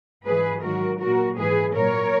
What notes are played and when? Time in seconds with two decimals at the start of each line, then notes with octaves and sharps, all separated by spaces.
0.26 G#2 E3 G#4 B4
0.63 G#2 D#3 F#3 F#4 A#4
1.01 A#2 F#3 F#4 A#4
1.38 G#2 E3 G#4 B4
1.76 A#2 F#3 A#4 C#5